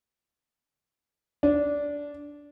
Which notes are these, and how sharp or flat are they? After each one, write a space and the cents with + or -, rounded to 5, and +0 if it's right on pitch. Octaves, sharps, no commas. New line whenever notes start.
D4 -15